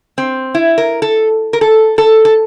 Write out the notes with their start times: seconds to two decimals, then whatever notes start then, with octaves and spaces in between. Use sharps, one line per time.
0.18 C4
0.54 E4
0.78 A#4
1.02 A4
1.53 A#4
1.61 A4
1.98 A4
2.25 A4